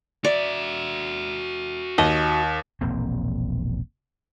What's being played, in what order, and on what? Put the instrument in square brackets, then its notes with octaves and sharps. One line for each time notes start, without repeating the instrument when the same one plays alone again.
[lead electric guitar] F#4 E5 [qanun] D5
[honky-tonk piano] D#2 [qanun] D#5
[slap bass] E1 A#1 A#3 C4